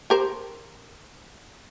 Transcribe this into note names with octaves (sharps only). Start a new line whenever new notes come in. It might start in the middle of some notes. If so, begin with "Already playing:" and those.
G4 A#4 C5